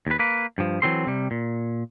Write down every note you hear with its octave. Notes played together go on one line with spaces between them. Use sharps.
D#2 B4
A#3 B4
G2 F3
E3 F#3 C4 A4 C6
C3 G3
A#2